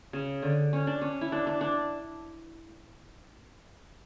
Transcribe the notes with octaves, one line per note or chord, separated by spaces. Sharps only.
C#3
D3
C#4
D4
C#4
E4
D4
D4
D4